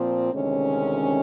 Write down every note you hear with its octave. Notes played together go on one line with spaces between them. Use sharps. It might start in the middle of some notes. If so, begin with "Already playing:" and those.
Already playing: A#2 F3 C4
D2 C3 D#3 G#3 C#4